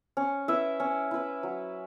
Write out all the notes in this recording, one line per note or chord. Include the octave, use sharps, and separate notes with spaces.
C#4
E4 B4 E5
C#4
E4 B4 E5
F#3